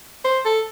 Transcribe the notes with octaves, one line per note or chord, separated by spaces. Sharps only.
C5
A4